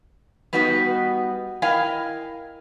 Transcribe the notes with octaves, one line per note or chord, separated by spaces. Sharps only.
G3 B3 D#4 F#4 B4
E4 A#4 D#5 F5 G5 G#5